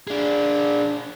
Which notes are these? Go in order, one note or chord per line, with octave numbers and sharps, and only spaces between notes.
D4 G#4